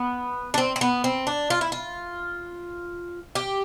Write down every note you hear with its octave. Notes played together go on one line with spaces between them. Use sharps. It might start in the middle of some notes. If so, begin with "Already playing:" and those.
Already playing: B3
D4
C4
C4
B3
C4
D4
F4
E4
F4
G4